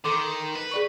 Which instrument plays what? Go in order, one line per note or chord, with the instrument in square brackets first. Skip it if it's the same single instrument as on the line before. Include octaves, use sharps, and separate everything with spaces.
[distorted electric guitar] D#3 [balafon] A4 C6 D6
[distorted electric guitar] B4
[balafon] G#4 D5 C#6